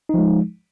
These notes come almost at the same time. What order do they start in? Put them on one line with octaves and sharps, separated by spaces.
D#4 F3 G#3